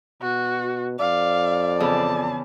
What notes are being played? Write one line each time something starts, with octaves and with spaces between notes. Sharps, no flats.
B2 F#4
F2 D5 F5
E2 C#3 G#4 A5